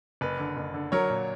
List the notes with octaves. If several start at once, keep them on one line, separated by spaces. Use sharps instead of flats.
F#1 B4
D3
F#1
D3
F#3 A#4 C#5
A#2